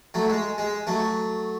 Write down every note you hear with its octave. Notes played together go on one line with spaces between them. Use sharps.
F#3 A3
G#3
G#3
F#3 A3